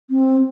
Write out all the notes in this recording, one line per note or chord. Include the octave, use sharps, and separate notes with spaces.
C4